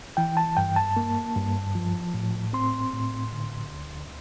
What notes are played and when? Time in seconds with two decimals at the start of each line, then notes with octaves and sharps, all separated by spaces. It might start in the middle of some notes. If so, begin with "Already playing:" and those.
0.17 E3 G5
0.37 A5
0.57 G2 G5
0.76 A5
0.97 A#3
1.36 G2
1.75 F3
2.14 A2
2.53 C4 C6
2.93 A2
3.32 D3
3.72 D2